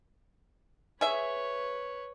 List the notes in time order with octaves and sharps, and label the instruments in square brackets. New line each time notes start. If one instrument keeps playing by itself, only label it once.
[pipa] G#4 E5 [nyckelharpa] B4 C#5